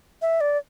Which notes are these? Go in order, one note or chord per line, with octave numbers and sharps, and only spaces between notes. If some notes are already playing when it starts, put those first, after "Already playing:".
E5
D5